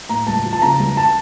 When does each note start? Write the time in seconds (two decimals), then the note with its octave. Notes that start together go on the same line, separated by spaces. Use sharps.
0.09 A2 A#5
0.27 C#2 A5
0.45 F3
0.53 A5
0.62 C#3 A#5
0.79 C#2
0.97 A5